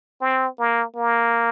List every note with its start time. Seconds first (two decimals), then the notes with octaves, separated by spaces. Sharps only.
0.21 C4
0.59 A#3
0.96 A#3